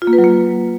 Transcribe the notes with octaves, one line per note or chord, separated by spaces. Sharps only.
F4
A#3
B4
F#3
A#3